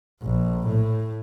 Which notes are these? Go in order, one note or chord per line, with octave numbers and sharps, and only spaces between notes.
A#1
A2